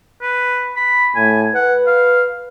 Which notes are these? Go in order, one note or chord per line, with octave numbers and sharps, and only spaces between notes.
B4
B5
A2 G#5
B4 F#5
F5